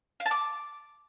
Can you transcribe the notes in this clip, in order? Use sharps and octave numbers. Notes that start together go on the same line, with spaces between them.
F5
A5
D6